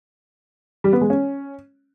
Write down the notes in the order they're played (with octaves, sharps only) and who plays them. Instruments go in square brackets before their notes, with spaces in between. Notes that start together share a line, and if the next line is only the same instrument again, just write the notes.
[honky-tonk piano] G3
B3
G#3
C#4